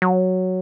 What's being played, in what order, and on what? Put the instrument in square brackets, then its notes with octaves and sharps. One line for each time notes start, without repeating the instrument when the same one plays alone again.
[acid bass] F#3